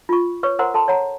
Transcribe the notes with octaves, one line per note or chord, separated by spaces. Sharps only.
F4 C#6
B4 C#5 C#6
A#4 C5 F#5 A#5 C6
A4 A5 C6
C#5 F#5 A#5